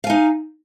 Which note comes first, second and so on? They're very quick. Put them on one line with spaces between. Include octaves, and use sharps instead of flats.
F5 G#5 D#4